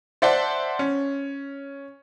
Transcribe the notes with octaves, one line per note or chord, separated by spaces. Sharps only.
C5 D5 E5 F#5 A5 C6
C#4